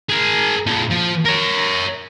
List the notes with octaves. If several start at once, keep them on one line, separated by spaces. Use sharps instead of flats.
G#4 A#4
A#2 A4
F3
A#4 C#5